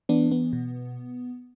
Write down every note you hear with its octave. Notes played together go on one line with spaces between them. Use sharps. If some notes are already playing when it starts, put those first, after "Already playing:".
E3 B3 D4
B3
B2